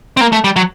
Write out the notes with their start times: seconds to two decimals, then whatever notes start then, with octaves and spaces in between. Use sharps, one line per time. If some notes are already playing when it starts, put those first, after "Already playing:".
0.17 C4
0.21 A#3
0.32 A3
0.44 G3
0.56 F#3